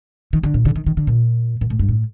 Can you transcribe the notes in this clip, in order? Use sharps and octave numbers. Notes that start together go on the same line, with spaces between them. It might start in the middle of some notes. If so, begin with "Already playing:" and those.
D#3
D3
A#2
D3
D#3
D#3
D3
A#2
A#2
A2
G2
A2